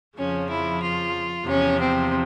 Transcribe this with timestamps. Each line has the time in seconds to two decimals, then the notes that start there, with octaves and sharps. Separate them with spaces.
0.17 F2 C#3 F3 C#4
0.50 E4
0.81 F4
1.46 E2 C3 F3 C#4
1.79 C4